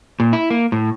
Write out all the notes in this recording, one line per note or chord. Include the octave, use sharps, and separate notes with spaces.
A#2
E4
A#3
A2